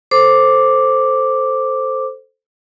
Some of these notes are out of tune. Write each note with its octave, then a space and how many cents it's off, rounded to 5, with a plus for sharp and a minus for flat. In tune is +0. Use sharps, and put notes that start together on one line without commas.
A4 +0 C5 +0 D6 +0